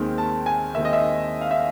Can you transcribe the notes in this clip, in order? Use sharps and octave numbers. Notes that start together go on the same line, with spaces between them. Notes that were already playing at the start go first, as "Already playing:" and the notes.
Already playing: D#2 D#3 G#3 C4
A5
G#5
D#2 D#3 G#3 C4 E5
D#5
E5
F5
E5